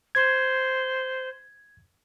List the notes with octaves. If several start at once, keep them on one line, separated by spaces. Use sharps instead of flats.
C5 G#6